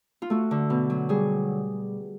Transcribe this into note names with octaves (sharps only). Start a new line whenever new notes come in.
F4
A3 F#4
D3
B2
F#3
G3 G#4